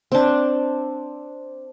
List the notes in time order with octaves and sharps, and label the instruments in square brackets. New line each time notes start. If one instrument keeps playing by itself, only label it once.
[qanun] C4 D4